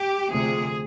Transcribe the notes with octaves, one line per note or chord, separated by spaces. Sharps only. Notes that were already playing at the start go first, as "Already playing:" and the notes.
Already playing: G4
D2 C3 F3 A3 G#4